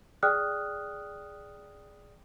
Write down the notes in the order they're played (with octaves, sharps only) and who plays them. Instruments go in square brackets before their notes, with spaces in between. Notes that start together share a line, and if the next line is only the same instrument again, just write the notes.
[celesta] G#4 D5 G5 D#6 F6 F#6